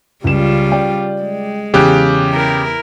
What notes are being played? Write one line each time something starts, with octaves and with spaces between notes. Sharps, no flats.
C#2 C#3 G3 F4 E7
D5 G5
G#3
E2 C#3 G4 F#6 D7
E4 A#4